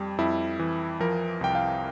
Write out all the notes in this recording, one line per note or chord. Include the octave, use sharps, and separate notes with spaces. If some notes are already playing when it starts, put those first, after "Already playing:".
Already playing: F2 G3
F2 E4
E3
F3 A#4
C2 G5
F5